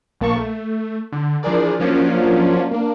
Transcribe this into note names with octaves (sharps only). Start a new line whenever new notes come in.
A#1 A#3 A5 C#6
A3
D3
E3 F3 D4 G#4 A#4 D5
F3 F#3 A#3 C#4 D4 F4
A#3 D4